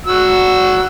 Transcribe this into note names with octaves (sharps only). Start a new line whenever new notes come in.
F#4 E6